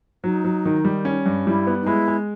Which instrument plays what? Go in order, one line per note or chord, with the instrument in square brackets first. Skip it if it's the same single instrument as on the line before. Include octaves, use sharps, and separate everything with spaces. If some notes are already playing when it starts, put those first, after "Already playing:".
[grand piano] F#3 [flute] D#4
[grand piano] F#3
D#3
G3
C#4
G2
[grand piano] G3 [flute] E4
[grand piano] B3
[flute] D#4
[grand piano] G#3 [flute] E4
[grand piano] G#3